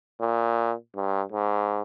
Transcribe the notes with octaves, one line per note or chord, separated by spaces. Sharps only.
A#2
G2
G#2